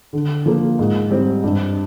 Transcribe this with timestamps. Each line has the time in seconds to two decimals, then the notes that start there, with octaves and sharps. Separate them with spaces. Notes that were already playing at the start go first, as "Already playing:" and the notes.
0.13 D3
0.46 F3 A#3
0.79 G#2
1.11 G3 C4
1.44 G2